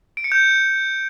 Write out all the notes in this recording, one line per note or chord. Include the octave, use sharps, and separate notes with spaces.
D7
C#7
G6